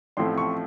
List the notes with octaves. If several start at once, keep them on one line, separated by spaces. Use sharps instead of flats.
A1 A2 F3 A3 C4 C6
C#6